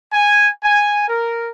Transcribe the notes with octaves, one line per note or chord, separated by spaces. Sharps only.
G#5
G#5
A#4